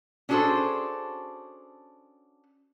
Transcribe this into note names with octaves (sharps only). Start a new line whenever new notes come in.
C#4 D4 F#4 G#4 A4 C5